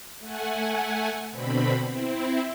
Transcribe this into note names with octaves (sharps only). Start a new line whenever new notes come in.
A3 F#5 G#5
B2 D3 C4 B5
C4 E4